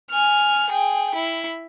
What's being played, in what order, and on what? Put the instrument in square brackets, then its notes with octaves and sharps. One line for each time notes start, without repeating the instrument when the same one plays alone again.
[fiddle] G#5 F6
G#4 G5
E4